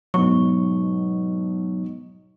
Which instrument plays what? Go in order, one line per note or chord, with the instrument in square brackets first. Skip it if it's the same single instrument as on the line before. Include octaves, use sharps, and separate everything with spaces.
[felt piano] G#2 B2 [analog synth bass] F#3 [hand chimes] C#6